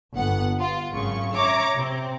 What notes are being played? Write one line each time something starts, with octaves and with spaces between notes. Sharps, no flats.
G1 B3 F#5
F4
G#1 F#2 C#3 C#6
C#5 E5 A#5 D6
C3 C4